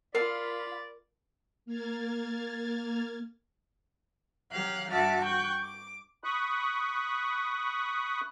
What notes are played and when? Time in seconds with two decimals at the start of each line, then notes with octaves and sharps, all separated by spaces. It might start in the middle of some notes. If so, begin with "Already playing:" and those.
0.15 F4 A#4 D5 F5 B5
1.66 A#3 F6 G#6 A6
4.52 F#3 G4 F5 F#6
4.90 G2 F#4 E5 A5 D6 F6
5.24 G5 C#6 F#6 G6
5.61 D6
6.24 B5 C#6 D#6 F#6